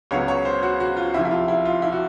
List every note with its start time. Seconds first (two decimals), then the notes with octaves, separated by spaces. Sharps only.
0.11 C#2 C#3 F#3 B3 C#5
0.28 C#5
0.45 C5
0.63 F#4
0.80 F#4
0.97 F4
1.13 C2 C3 F3 E4
1.25 E4
1.31 F4
1.48 E4
1.65 F4
1.82 E4
1.92 F#4